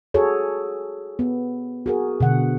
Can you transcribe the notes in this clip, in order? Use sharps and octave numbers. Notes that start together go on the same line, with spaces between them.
F#4 G#4 A4 C#5
B3
F#4 G#4 A#4
B2 D3 F#5